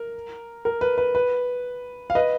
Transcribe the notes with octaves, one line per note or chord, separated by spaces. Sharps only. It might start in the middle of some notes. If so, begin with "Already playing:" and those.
Already playing: A#4
A#4
B4
B4
B4
F5
B4 D#5